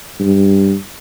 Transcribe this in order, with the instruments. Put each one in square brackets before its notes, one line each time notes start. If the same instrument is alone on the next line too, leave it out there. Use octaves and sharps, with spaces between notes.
[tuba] G2